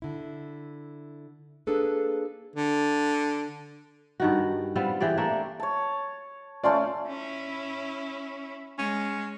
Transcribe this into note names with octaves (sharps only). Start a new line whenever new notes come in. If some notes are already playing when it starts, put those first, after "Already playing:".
D3 E4
A#3 D4 G#4 A4 B4
D3
G2 D#3 F#4
G3 B3 C4 F4
E3 G4 G#4 D5
A3 A#3 D4
C#5 A5
A3 C#4 F4 D5 C6
C#4 E4
G#3 C#4